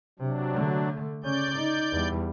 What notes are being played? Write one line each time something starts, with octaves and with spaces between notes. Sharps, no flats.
C3 F#3 D4
D3 A3
C#3 C#4 D5 G6
D#4
E2 G3